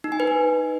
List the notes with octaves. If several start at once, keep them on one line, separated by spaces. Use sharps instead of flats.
D#4
G#5
B4
D#4